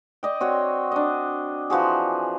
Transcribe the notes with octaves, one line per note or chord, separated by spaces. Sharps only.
D5 D#5 G5
C4 F#4 C#5
D4 D#5
E3 F3 F#4 G#4